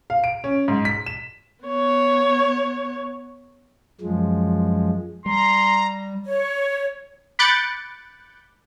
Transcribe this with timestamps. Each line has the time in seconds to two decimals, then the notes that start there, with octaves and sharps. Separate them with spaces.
0.10 F5
0.24 D7
0.44 C#4
0.68 G#2
0.85 B6
1.06 E7
1.65 B3 C#5
4.01 F#2 F3 G#3
5.26 G3 A#5 C6
6.24 C#5
7.39 B5 D6 F#6 G6 A6 C#7